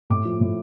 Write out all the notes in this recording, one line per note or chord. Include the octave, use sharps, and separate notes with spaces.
A2 D6
F3
A2